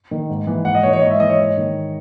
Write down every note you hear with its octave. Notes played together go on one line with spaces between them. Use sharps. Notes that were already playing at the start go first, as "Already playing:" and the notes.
D#3
G#2
E3
G#2 F#5
D#5
E3 C#5
C#5
G#2 D#5
E5
E3 D#5
C#5
G#2
D#3